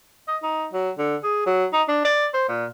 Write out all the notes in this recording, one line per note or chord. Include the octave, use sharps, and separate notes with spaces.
D#5
D#4
F#3
D3
G#4
F#3
D#4
D4
D5
C5
A#2